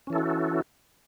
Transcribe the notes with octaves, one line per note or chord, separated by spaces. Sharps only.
E3 C#4 E4 F#4 A4